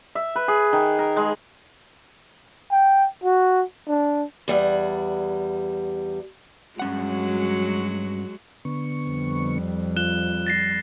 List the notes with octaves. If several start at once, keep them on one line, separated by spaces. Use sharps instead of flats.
E5
B4
G#4
D#3
A#4
G#3
G5
F#4
D4
E2 G3 F#5
G2 F#3 G#3 C#4 F#4 F#5
D3 B3 C#6
F2 G3
F4 F#6 E7 G7
A6 A#6 C7